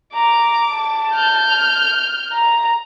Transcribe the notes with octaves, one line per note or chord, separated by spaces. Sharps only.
A#5 D6
A5
F6 G6
A#5